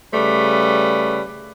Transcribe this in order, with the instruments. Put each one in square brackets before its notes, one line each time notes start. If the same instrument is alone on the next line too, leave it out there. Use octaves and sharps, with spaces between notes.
[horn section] C#3 G3 A3 B4